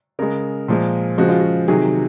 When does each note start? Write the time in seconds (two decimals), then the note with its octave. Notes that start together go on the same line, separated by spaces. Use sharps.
0.19 C#3 G#3 A#4
0.68 A#2 F3 G#3
1.18 C#3 F3 G#3 F#4
1.29 F4
1.40 F#4
1.68 C3 D#3 F#3 G#4